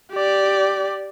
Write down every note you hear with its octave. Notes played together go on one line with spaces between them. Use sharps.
G4 D5